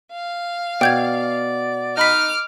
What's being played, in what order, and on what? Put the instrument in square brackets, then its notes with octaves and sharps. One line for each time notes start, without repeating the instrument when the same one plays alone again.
[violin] F5
[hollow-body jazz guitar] B2 [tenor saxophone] D5 [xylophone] G5 G6 G#6
[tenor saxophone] D#4 [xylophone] D#5 B5 B6 [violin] D6 F6